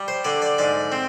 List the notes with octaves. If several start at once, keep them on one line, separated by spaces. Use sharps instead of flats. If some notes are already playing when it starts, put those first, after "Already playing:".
Already playing: G3
C5
D3 D5
D5
G#2 D5
C4